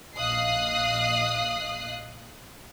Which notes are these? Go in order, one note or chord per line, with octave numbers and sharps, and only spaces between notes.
A#1 D#5 F5 D#6 F#6 C7